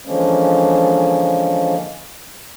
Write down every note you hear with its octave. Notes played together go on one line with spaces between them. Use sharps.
D3 E3 F3 G#3 A#3 C#4